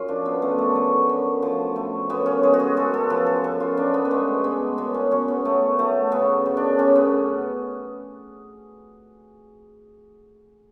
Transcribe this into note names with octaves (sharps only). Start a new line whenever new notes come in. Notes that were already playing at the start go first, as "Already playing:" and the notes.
Already playing: F#2 F4
F3 D4
B3
F#2 A3
A3
A3
F#2
F3
A3
F#2 B3
C#4
G#3 G#4
F#4
G#4
F#2 A4
A4
F3 B4
A4
F#2
F4
F#2 D4
B3
B3
G#3 A3
G#3 B3
F#2 B3
C#4
F#3 C#4
B3
F#2 A3
F#3 A3
C#3 B3
F#2
D4
F#2 C#4
B3